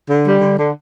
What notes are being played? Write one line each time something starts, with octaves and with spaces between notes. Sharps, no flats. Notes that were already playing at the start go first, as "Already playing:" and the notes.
D3
G3
D3
D3